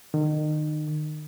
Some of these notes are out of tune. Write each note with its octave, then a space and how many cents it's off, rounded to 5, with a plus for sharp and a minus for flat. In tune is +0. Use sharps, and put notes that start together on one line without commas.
D#3 -30